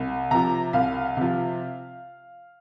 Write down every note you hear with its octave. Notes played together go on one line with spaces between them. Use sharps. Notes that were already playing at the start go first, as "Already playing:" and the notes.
Already playing: C2
C3 F3 A#5
C2 F5
C3 F3